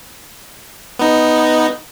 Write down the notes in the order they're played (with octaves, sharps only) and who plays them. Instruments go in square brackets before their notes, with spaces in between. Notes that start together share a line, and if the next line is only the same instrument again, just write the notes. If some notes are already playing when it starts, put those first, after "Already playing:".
[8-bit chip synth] B3 D#4